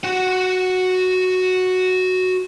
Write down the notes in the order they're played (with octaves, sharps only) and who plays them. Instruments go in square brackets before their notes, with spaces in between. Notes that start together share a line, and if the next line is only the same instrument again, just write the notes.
[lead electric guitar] F#4 F#5